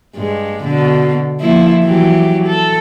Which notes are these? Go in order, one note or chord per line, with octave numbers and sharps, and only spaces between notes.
G2 G#3
B2 D3
F3 A#3 E4
E3 F#3 G4
A4